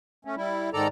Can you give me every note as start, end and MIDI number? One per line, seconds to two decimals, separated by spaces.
0.25 0.35 57
0.25 0.35 61
0.36 0.70 55
0.36 0.70 64
0.73 0.88 44
0.73 0.88 51
0.73 0.88 69
0.73 0.88 74
0.73 0.88 82